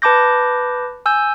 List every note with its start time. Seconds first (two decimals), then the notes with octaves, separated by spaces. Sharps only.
0.02 B4 A5 B5 D6 G6 A#6
1.06 G#5 E6 G6